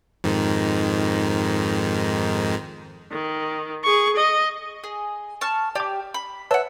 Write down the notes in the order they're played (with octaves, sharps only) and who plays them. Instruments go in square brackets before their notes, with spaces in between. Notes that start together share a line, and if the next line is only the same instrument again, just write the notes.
[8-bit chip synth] F2 G#2 D#3
[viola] D#3
G#4 C#6
D#5
[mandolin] G#4
A5 C#6 F6
[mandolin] G4 [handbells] D5 D6
[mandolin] B5
[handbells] B4 C#5 A5 [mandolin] E5 F#5